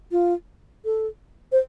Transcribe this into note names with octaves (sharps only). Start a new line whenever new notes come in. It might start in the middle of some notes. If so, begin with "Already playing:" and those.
F4
A4
C5